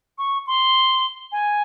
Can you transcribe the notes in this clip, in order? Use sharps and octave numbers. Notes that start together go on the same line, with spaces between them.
C#6
C6
G#5